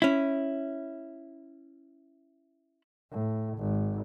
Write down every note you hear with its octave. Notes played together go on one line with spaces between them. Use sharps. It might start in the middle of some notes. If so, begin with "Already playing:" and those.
C#4 E4
A2
G#1